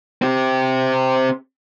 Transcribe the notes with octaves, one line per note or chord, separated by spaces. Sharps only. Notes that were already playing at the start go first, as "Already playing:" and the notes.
C4 G4